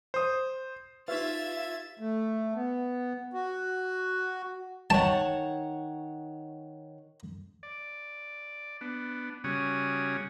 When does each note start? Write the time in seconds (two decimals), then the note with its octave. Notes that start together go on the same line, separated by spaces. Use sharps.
0.14 C5 D#6
1.08 D#4 F4 G4 B4 E5 G#6 A6
1.99 A3
2.55 B3
3.33 F#4
4.90 D#3 C#5 F#5 A5
7.63 D5
8.81 B3 D4
9.44 C#3 G3 C#4 F#4 D#6